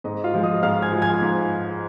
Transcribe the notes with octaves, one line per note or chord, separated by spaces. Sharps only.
G#2 D#5
F4 F5
F3 G#3
D#5 D#6
G#2 F5 F6
G#5 G#6
F3 G#3
G#5 G#6
G#2